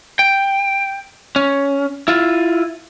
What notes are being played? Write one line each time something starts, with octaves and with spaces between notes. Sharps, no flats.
G5
C#4
E4 F4